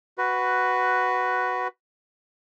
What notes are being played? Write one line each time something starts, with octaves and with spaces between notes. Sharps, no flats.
F#4 B4